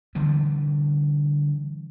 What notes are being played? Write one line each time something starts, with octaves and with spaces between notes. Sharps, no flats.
D3 E3 G3